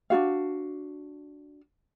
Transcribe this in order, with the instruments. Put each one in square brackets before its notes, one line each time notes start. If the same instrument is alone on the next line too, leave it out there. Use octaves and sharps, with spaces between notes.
[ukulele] D4 F4 F#4 F5